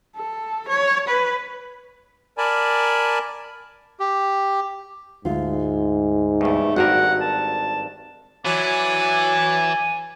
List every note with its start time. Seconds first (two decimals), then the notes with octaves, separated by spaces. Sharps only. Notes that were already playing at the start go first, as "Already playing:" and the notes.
0.16 A4
0.69 C#5
1.08 B4
2.38 A#4 D5 G#5 A5 B5
4.00 G4
5.25 D2 G#2 F4
6.41 E2 G2 A3
6.76 G#1 G2 F#4 A#4 F#5
7.21 A5
8.45 E3 F#3 D5 G#5